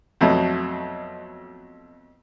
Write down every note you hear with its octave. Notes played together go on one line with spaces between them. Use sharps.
F2 B2 F#3 A3